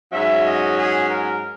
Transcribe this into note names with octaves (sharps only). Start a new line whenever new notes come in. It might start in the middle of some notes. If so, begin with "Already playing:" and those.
G#2 F#3 C#4 E5
D#5
G#4
A#4